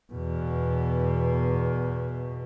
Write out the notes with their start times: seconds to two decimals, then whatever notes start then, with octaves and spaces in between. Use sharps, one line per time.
0.12 E2 B2